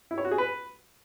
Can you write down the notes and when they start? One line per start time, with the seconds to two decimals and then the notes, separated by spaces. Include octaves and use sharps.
0.11 E4
0.18 C#5
0.25 F#4
0.31 G#4
0.38 B4